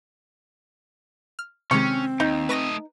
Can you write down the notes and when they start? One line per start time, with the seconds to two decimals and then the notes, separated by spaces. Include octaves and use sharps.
1.39 F6
1.71 C3 D#3 G#3 C4 C#4 C#6
2.20 D#2 D#4
2.49 A3 B4 D#5 C#6 A#6